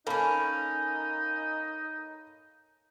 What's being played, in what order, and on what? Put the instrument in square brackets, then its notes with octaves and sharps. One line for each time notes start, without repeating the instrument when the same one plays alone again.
[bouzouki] A#3 C#4 [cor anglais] D#4 [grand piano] A4 A5 B5